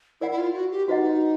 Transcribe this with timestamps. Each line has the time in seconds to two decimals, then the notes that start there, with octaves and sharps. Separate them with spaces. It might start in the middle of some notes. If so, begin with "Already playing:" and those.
0.21 E4 A#4 D5 F#5
0.31 E4
0.38 F4
0.54 F#4
0.71 G4
0.88 D#4 F#4 B4 D#5 F#5